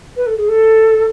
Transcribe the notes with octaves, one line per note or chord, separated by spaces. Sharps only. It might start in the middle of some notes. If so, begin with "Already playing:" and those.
B4
A4
G#4
A4